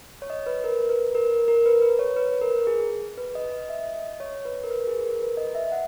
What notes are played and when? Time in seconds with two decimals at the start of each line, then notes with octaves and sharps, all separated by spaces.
0.22 C#5
0.30 D#5
0.46 B4
0.64 A#4
0.89 B4
1.15 A#4
1.48 A#4
1.66 B4
1.82 B4
1.99 C#5
2.16 B4
2.41 A#4
2.67 G#4
3.18 B4
3.35 D#5
3.51 D#5
3.69 E5
3.94 D#5
4.20 C#5
4.45 B4
4.64 A#4
4.71 B4
4.87 G#4
5.04 A#4
5.22 B4
5.37 D#5
5.55 E5
5.72 F#5